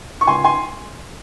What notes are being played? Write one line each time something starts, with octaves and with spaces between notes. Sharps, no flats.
C#6
C#2 G#5 C6
G#5 C6